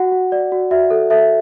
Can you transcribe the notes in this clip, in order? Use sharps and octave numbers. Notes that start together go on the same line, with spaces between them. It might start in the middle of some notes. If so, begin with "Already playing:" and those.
Already playing: F#4 F#5
F#4
D5
F#4
F#4 E5
A4
A4 E5